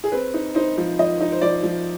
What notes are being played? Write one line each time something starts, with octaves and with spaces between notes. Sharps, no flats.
G#4
C4 B4
D#4
D#4 C5
F3
F3 D#5
D#4
C5
F3 D5
F3